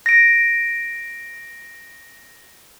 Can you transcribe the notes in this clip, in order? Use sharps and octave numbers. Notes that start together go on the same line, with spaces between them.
A#6 D7